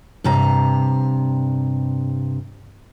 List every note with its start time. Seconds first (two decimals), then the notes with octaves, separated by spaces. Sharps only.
0.24 G2 C3 A#5